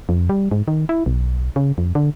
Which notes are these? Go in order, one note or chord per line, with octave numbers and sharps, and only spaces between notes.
F2
G3
G#2
D#3
E4
B1
C#3
F2
D3